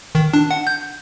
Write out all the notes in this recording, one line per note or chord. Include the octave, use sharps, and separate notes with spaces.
D#3
D4
F#5
G6